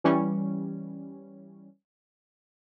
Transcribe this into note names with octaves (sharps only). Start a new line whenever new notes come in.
E3 G3 C#4